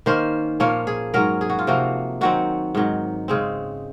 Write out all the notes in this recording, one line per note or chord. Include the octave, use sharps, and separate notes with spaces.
D#3 A#3 C#4 C5
A#2 F3 A#3 C#4 C#5
G#4
G#2 F#3 C#4 A#4
G#4
F#4
F4
C3 F3 A#3 F#4
D#3 F#3 C4 F#4
G#2 D#3 F#3
C#3 G#3 C4